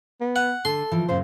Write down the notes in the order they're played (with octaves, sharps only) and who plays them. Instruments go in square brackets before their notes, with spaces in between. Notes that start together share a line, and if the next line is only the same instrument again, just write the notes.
[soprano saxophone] B3
[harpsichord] F#5
[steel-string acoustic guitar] D3 [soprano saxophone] A4 [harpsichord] C6
[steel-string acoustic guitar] E3 F3
[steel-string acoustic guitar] F#2 A#2 C#3 [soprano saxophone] C5